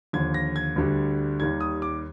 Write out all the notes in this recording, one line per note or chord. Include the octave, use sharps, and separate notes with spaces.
D#2 D3 F3 G#6
A#6
G#6
D2 D3 G3
D#2 D#3 G3 G#6
D#6
D6